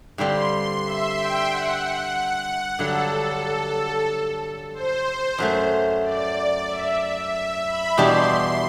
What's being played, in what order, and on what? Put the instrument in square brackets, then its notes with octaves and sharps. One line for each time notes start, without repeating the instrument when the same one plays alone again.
[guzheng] G2 D3 G3 C4 [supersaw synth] C6
[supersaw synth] E5
G5
F#5
[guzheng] G2 D3 F#3 [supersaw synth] A4
[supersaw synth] C5
[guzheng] F#2 F#3 A3
[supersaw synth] D5
E5
E5
B5
[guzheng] E2 B2 G3 D4 G4 [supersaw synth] C6